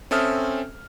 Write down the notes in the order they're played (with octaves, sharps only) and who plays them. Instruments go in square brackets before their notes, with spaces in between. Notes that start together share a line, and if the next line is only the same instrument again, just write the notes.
[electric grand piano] C4 C#4 A4 E5 D#6 F6